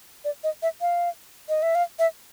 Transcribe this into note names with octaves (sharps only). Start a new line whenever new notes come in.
D5
D#5
E5
F5
D#5
E5
F5
E5